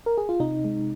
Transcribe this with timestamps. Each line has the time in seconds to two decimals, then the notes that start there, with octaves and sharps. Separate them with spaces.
0.06 A#4
0.18 G#4
0.29 F4
0.40 C3 D#4
0.65 G#3